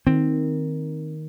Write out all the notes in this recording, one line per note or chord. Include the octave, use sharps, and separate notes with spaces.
D#3 C4